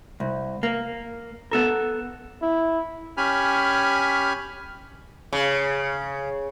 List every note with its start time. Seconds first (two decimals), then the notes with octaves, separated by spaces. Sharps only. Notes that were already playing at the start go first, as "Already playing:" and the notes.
0.20 C2
0.63 A#3
1.51 B3 A4 A#4
2.42 E4
3.17 C#4 G4 G#5 B5 F6
5.33 C#3